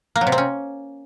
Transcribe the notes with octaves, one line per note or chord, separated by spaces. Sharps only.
A#3
F#3
C3
C4
C#4